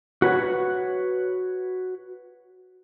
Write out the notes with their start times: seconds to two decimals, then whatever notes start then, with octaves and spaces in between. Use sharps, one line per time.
0.22 F#4 B4 C#5 F#5